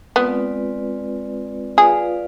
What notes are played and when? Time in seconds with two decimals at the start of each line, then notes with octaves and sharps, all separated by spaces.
0.16 G#3 B3 C4 F4 B4 D5
1.77 F4 G#4 B4 D5 F5